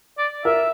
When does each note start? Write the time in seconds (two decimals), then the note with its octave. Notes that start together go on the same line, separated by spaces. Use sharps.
0.18 D5
0.45 A#4 E5